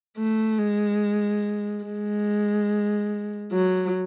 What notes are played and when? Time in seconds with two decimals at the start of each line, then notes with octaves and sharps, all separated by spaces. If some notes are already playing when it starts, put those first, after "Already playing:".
0.17 A3
0.58 G#3
1.85 G#3
3.52 F#3